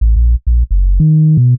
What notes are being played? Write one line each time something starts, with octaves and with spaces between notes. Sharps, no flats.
A1
A#1
A#1
F#1
D#3
B2